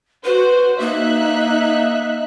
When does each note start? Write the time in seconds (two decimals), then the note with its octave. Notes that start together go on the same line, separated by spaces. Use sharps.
0.24 F#4 B4 C5
0.80 A#3 D#4 E5 F#6